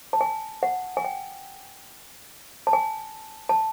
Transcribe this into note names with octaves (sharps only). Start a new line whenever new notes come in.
A5
G#5
F#5
G#5
G5
A5
G#5
A5